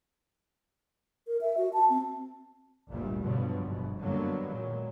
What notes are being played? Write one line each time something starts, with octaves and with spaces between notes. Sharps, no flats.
A#4
E5
F#4
A5
C4
G1 D2 A#2 G3
G2 B2 D3 F3 F#3
G1 G#2 B2
F#2 D3 F#3 G3 A#3 B3
A#2 D#3 F#3 G#3